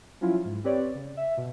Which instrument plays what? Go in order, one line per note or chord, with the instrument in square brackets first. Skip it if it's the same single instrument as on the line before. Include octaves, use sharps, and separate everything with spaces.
[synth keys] F3 F#3 C#4 E4 F4
G#2
C4 G4 B4 C#5 D5
C#3
E5
B2